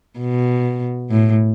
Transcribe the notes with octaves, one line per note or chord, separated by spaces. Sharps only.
B2
A2